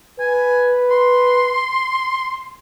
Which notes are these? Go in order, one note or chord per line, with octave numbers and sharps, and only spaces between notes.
B4 G#5
C6